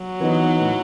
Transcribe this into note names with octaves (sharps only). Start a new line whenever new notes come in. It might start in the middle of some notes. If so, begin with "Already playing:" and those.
Already playing: F#3
E3 B3 D#4
A2